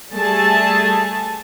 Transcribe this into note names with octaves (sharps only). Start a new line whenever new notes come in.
G3 A3 G#4 A5